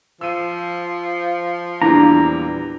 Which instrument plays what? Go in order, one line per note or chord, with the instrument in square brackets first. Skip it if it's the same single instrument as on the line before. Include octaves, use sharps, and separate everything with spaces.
[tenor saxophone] F3 [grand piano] E6 D#7
[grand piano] E2 A#2 G3 [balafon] D4 E4 [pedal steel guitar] A#5